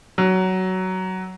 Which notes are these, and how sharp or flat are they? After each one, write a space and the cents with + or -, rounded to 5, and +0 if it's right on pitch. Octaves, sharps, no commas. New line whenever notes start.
F#3 +15